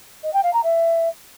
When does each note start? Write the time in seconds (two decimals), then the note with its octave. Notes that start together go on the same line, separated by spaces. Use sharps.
0.23 D#5
0.33 G5
0.43 F5
0.53 A#5
0.63 E5